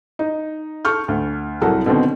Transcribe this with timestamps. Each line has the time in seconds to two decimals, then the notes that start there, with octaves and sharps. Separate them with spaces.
0.19 D#4
0.85 A4 C#6 F6 G6
1.08 D2
1.62 C2 F#3 A4 A#4 F#5
1.86 B2 D3 D#3 C4